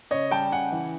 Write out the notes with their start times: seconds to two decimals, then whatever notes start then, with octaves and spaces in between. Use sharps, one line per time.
0.11 C#3 C#5 D#5
0.31 G3 G5 A5
0.52 C#3 F#5 G#5
0.72 E3